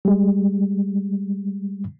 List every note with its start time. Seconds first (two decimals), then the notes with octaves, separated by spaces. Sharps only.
0.05 G3 G#3